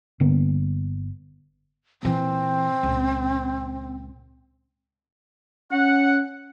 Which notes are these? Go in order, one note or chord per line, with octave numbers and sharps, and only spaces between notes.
G1 D3 A#3 B3
A#2 E3 C4
C#2 A#2
C#4 F#5